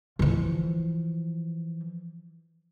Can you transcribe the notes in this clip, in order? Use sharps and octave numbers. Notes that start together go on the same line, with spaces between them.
E3 F3